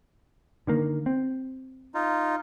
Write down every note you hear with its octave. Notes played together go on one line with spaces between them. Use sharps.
D3 D#3 A#3
C4
D#4 F4